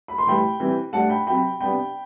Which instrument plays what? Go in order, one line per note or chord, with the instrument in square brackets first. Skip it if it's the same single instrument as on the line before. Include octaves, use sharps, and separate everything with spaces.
[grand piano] B5
C6
A2 E3 G3 G5 B5
E3 G3 C4
A2 G3 D4 F#5 A5
G5 B5
C3 F#3 C4 G5 B5
C3 G3 B3 D4 G5 B5